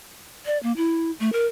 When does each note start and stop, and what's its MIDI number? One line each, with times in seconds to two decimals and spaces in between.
0.46 0.58 74
0.63 0.72 58
0.77 1.11 64
1.20 1.32 57
1.33 1.46 70